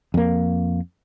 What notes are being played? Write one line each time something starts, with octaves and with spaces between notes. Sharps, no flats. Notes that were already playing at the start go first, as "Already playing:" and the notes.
F2 A#3